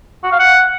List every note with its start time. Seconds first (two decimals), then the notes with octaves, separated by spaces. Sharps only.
0.24 F#4
0.31 F5
0.39 F#5